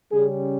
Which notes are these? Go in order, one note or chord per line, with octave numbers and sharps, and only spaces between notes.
C#3 G3 C#4 G#4